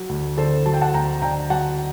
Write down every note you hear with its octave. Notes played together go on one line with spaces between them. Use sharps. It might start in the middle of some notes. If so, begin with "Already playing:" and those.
Already playing: F#3
D2
D3 A4 C5
F#3 A5
G5
F#5 A5
D2 G5 A#5
D3 G5 A#5
F#3 F#5 A5